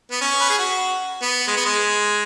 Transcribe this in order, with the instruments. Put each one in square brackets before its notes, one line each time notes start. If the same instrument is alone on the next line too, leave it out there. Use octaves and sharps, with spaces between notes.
[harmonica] B3
C#4
B4
G#4
F#4
B3
G#3
B3
G#3